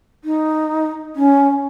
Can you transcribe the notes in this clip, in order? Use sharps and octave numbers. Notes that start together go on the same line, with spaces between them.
D#4
C#4